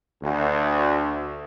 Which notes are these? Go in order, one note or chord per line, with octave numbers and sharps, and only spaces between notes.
D2